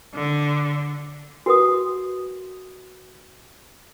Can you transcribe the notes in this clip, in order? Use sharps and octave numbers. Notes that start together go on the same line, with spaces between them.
D3
F#4 A#4 B4 D#6